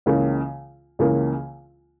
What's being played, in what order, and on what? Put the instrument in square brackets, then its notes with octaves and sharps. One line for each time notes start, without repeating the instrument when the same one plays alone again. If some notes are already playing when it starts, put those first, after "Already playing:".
[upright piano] C#2 C#3 E3 A#3
C#2 C#3 E3 A#3